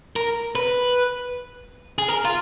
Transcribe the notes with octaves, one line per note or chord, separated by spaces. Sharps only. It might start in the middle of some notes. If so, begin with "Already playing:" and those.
A#4
B4
G#4
A#4
F4